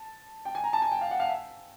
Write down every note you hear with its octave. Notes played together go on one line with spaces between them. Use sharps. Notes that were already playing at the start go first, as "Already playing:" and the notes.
Already playing: A5
G5
G#5
A#5
A5
G#5
G5
F5
F#5
F5
E5